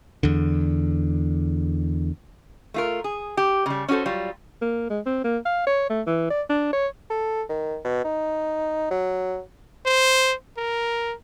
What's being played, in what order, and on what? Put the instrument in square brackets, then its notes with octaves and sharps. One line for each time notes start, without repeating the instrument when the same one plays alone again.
[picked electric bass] E2 D3
[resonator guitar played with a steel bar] A3 F4 A#4
G#4
G4
C#3 G3
C#4 D4 F#4 A4 C5
F#3 G3 F4
[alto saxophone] A#3
G#3
C4
A#3
F5
C#5
A3
E3
D5
D4
C#5
[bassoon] A4
D#3
B2
D#4
F#3
[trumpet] C5
A#4